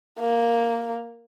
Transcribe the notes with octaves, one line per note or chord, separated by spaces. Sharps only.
A#3